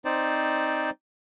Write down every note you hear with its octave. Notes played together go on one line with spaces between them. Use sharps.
C4 D#4 C5 D5